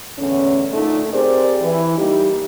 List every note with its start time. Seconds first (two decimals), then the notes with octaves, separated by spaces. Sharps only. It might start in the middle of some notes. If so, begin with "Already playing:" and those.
0.19 E2 A2 D3 C#4
0.73 A#2 D3 A3 D#4
1.13 C4 G4 G#4 A#4 C5 D5
1.61 E3 E4
1.98 G3 A#3 D#4 E4 G4